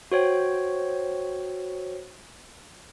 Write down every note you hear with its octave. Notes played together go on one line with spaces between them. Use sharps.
F#4 C5 C#5 G5